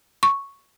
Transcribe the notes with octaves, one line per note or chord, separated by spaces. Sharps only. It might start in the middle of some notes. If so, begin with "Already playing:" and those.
C#6